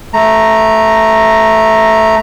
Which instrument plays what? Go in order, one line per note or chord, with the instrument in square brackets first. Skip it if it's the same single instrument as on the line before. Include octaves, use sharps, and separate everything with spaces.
[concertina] A3 A#5